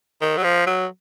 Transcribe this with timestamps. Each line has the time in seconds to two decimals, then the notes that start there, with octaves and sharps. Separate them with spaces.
0.21 D#3
0.37 F#3
0.43 F3
0.67 F#3